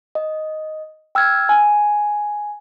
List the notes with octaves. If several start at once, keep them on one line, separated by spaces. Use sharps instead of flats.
D#5
G5 E6 F6 G#6
G#5